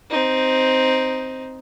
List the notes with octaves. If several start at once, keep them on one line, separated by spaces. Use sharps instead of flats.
C4 D#4